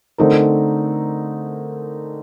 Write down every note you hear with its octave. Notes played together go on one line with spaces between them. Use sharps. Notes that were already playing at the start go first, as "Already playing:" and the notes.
D3 A3 C4 D#4 A#4